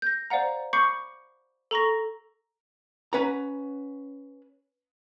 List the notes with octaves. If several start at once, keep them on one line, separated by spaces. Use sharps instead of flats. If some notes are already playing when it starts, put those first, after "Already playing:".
G6 A#6
C5 D5 F5 F#5 A#5
B5 C#6 D6 G6 C7 C#7
A4 A#5 C#6 A#6
C#4 B4 F#5 A#5